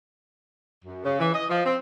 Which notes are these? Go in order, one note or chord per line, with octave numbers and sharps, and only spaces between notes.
F#2
C#3
E3
D#5
F3
C4